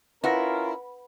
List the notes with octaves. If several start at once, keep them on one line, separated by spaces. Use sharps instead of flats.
C#4 E4 F4 A#4 B4 F#5 A#6